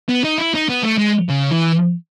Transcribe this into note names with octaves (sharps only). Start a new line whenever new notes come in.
B3
D#4
E4
D#4
B3
A3
G#3
C#3
E3